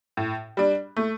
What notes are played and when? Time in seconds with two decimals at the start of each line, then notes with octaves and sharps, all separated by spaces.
0.17 A2
0.57 G3 D4
0.97 A3